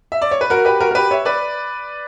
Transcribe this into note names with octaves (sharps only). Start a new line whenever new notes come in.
E5
D5
C#5
B4
F#4 A#4
G4 B4
F#4 A#4
A#4
G4 B4
C#5 E5
B4 D5